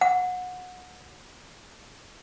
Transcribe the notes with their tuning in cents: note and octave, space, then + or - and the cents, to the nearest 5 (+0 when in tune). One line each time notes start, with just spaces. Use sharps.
F#5 -25